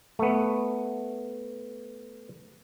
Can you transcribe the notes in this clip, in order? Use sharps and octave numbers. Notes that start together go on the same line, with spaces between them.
A3 B3